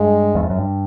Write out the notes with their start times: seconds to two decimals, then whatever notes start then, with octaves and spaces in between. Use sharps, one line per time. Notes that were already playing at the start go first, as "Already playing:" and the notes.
Already playing: G2 G#3
0.35 E2
0.43 F2
0.50 F#2
0.58 G2